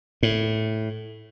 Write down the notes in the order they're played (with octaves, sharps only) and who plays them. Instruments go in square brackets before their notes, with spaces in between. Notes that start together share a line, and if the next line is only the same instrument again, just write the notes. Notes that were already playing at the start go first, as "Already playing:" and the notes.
[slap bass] A2